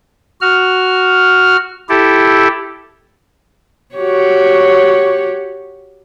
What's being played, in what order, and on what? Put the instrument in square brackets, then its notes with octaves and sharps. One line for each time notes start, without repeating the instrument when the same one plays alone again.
[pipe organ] F#4 F6
E4 G4 A4
[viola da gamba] F#4 G4 C#5